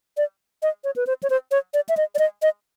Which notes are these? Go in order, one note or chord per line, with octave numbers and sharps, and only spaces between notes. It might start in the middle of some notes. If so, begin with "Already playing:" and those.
D5
D#5
C#5
B4
C5
C#5
C5
C#5
D5
E5
D#5
D5
D#5
D#5